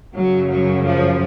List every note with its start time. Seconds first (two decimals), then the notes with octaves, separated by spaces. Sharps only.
0.15 F#2 C#3 F#3
0.50 F#3
0.85 F3